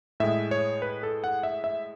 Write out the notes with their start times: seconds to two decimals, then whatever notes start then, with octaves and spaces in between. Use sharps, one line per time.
0.20 A2 G#3 E5
0.51 C#5
0.82 B4
1.03 A4
1.24 F#5
1.43 E5
1.64 E5